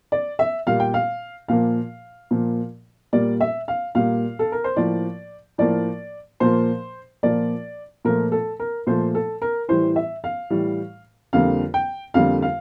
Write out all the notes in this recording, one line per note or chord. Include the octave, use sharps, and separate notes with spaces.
D5
E5
A#2 G3 A#3 F5
G5
F5
A#2 F3 A#3 F5
A#2 F3 A#3
A#2 G3 A#3 D5
E5
F5
A#2 G3 A#3 F5
A4
A#4
C5
A2 F3 A#3 D5
A2 F3 A#3 D5
A#2 F3 A#3 C5
A#2 F3 A#3 D5
A#2 F3 A3 A#4
A4
A#4
A#2 F3 A3 C5
A4
A#4
A2 E3 G3 C5
E5
F5
A2 E3 G3
F2 D3 G3 A#3 F5
G5
F2 D3 G3 A#3 F5
F5